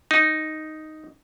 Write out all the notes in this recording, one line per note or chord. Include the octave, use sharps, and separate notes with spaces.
D#4